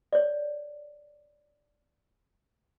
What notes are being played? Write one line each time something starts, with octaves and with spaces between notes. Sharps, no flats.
C#5 D5